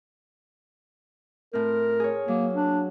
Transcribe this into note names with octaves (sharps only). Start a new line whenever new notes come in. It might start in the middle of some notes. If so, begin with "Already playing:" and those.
A2 C4 A#4
G#4 C#5
F#3 A#3
D4